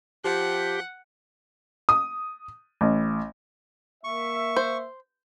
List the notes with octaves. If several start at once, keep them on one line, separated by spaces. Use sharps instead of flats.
F3 G4 F#5
D#6
A1
A#3 E5 C#6
C5